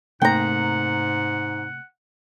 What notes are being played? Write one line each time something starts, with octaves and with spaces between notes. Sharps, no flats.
G#2 C3 A3 A#3 F#5 G5 A#5